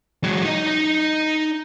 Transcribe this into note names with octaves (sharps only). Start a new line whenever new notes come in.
F#3 G#3
D#4 D#5